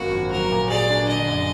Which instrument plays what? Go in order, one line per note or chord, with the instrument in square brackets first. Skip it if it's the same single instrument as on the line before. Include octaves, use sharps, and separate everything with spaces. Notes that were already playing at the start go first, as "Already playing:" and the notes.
Already playing: [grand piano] G#1 F#2 A#3 D4 [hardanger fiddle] F#4
[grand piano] F3
[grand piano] F#3 [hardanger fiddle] A#4
[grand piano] A#2
[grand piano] G#4 [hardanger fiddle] D5
[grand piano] D4
[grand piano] D3 [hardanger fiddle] D#5
[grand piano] F#2